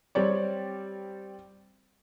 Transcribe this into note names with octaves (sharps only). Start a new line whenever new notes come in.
G3 C4 C#5 D5